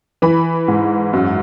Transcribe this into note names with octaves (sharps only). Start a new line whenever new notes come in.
E3 B5
G#2
F#2